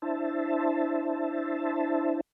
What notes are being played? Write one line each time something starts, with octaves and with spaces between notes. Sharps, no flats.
D4 E4 C5 E5 A5